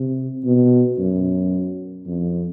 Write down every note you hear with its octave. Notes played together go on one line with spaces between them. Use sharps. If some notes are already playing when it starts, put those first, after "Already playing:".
Already playing: C3
B2
F#2
F2